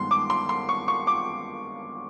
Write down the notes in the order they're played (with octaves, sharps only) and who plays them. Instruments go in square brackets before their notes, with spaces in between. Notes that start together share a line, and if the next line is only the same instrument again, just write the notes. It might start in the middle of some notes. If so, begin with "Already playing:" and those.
Already playing: [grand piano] G2 D#3 G#3 B3 C6
D6
C6
C6
C#6
C#6
D6